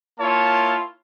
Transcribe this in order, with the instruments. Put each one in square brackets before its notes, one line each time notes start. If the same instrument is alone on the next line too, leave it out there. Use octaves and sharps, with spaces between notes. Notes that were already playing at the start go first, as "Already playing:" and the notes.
[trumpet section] A#3 E4 F4 C#5 A5